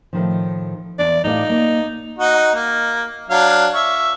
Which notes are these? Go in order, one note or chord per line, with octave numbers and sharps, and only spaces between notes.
A2 D#3 F3
E2 D5
A2 D#4 F4 D5
A#3
D#4 F#4 D#5
A#3
F#3 D4 F5
E5 C#6